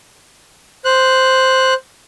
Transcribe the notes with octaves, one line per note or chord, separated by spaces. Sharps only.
C5 F#6